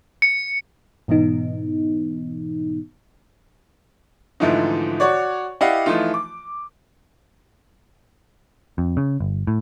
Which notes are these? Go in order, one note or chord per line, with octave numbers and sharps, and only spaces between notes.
C#7
G#2 B2 E3 B3 D#4
G#2 D3 E3 F3 A3 D#4
F#4 C#5 D5
E4 G4 D5 D#5 F5 F#5
E3 F3 A3 D#4 F4
D6
F2
C#3
G1
A2